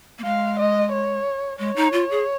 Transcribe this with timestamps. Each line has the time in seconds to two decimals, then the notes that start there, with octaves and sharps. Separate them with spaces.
0.18 A#3
0.24 G#3 F5
0.59 D#5
0.92 C#5
1.59 G#3 C#5
1.76 D#4
1.93 F4
2.11 G#4